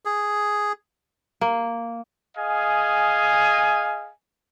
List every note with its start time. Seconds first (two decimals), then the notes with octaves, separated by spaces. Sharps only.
0.05 G#4
1.41 A#3
2.36 G#4 D#5 F5 G#5